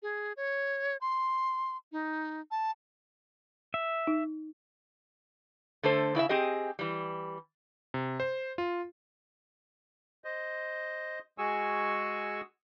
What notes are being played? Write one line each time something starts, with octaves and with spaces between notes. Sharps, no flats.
G#4
C#5
C6
D#4
A5
E5
D#4
D3 A3 A4 C5
C#3 E4 D5 E5
C4 G4 G#4 D#5
E3 G3
C3
C5
F4
C5 D#5
G#3 F#4 G#4 G#5 C#6 E6